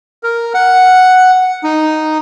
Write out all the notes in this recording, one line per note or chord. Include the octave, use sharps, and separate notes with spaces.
A#4
F#5
D#4